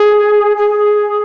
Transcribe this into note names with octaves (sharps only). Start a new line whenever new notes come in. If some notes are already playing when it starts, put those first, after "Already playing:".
Already playing: G#4
G#4